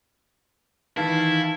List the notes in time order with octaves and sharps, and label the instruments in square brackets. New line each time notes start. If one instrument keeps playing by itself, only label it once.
[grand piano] D#3 E3 [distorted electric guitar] E4 [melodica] F5 A5